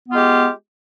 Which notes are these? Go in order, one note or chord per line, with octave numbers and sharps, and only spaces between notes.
G#3 B3 F4 G4